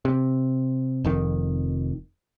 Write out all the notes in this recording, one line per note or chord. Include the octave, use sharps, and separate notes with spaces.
C3
F1 F2 D#3